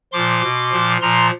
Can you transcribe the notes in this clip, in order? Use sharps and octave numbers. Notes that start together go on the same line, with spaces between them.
A#2 F3 C6 D6
B2
A#2 F3
A#2 F3 A#5 C6